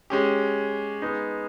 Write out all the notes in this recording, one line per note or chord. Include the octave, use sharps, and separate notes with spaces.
G#3 C#4 G4
G#3 B3 D#4